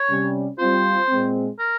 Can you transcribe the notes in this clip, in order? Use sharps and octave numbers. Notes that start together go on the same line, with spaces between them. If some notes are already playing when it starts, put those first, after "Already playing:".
Already playing: C#5
C3 G3 C#4
G3 C4 F4 C5
A#2 G#3 C4
A#4